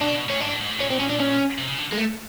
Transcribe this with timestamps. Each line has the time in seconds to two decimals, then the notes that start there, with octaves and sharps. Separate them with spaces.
0.01 B2 D4
0.14 B2
0.28 A2 C#4
0.40 G#2 D4
0.51 A2
0.61 G#2
0.71 A2
0.80 A#2 C#4
0.90 C4
1.00 C#4
1.10 D4
1.20 C#4
1.58 C3
1.68 C#3
1.78 D3
1.92 G#3
1.97 A3